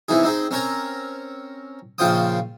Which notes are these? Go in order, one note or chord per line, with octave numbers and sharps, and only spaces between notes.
C3 E3 D#4 G#4
C4 D#4 G#4
C4 C#4 A#4 C#5 A#5
A#1 C#3 F4 C5 G5 D#6